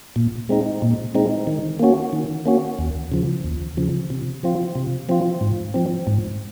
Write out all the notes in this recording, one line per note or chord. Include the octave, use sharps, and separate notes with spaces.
A#2
G#3 C4 D#4
A#2
G#3 C4 D#4
D#3
A#3 C#4 F#4
D#3
A#3 C#4 F#4
D#2
C#3 F3
D#2
C#3 F3
C3
F3 C4 F4
C3
F3 C4 F4
G#2
F3 C4
G#2